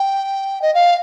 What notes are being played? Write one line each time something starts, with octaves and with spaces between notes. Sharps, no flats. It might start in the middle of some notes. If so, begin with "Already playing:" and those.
Already playing: G5
D#5
F5